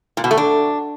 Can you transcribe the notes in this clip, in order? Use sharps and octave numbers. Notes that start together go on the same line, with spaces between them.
A#2
B2
A3
D4